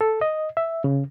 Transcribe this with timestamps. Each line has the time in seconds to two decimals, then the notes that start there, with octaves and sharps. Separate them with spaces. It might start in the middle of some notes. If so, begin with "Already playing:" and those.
0.01 A4
0.21 D#5
0.57 E5
0.84 C#3